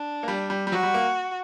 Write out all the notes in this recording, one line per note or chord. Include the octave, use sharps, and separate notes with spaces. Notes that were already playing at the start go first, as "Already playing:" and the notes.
Already playing: D4
A#3
G3
G3
G3
F#3 F#4
G3
A#3